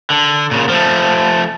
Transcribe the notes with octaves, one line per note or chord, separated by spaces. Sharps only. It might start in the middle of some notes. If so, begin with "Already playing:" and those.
D3
A#2 C#3
F3 A3